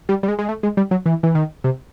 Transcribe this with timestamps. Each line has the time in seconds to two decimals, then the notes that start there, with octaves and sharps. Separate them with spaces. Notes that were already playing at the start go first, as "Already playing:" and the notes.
0.09 G3
0.23 G3
0.28 G#3
0.39 G#3
0.49 A3
0.63 G#3
0.77 G3
0.91 F#3
1.06 E3
1.23 E3
1.35 D#3
1.64 C3